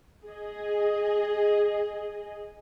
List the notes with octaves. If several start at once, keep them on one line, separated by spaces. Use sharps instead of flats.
G#4 D#5